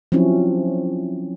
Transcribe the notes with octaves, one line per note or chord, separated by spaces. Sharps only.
F3 F#3 C4 C#4 E4